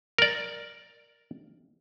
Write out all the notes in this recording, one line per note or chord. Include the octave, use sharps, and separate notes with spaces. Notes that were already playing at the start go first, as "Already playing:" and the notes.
A#4 D5